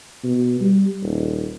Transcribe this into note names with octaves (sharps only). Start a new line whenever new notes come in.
B2
G3
D#1